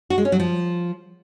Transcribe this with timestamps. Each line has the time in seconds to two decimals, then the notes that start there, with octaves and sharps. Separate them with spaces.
0.10 F#4
0.18 G#3
0.25 C#4
0.32 F#3
0.40 F3